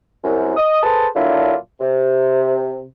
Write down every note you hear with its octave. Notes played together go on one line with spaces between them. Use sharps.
C2 F#2
D#5 D#6
G#4 A4 B4 C5 A5
A#2 D3 F#3 D4 E4 F4
C3